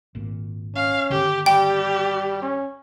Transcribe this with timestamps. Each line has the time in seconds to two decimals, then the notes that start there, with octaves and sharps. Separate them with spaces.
0.15 G#1 A#2
0.75 C#4 F5
1.10 G1 D3 D#3 G4
1.46 G3 G4 G5
2.42 C#4